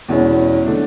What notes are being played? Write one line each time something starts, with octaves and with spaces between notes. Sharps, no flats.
E2 B2 G#3 C#4 E4
D3 A3 D4